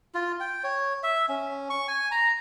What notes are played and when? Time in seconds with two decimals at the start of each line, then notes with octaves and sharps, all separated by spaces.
0.14 F4
0.40 G5
0.64 C#5
1.03 E5
1.29 C#4
1.70 C#6
1.88 G#5
2.11 A#5